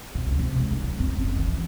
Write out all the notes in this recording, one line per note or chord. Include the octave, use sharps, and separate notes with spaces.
C3
C#2
C3
G#3
D#4
F#3
C4
F#1
D#3
E3